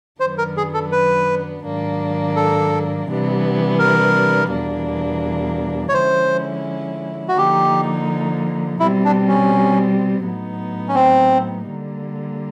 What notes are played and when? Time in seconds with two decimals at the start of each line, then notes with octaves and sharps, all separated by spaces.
0.20 F#2 D#3 F#3 B3 D4 C5
0.38 A#4
0.57 G#4
0.74 A4
0.92 B4
1.64 G#2 D#3 F#3 A#3 D4
2.36 A4
3.07 C3 E3 G3 B3 D4
3.79 A#4
4.50 E2 B2 G3 A#3 D4
5.89 C#5
5.94 D3 F3 G#3 C#4 E4 C5
7.28 F#4
7.37 D3 F3 A#3 D#4 G4
8.80 B2 G3 C4 E4
9.05 D4
9.28 C#4
10.24 A2 F#3 B3 D#4
10.89 C#4
10.95 C4
11.67 D3 G3 A#3